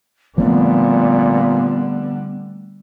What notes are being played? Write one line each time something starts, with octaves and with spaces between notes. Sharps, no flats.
A#2 D3 F3 G3 A3 B3 C4